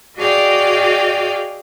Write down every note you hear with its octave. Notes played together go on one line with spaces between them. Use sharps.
F#4 G#4 D5 D#5 F5 G5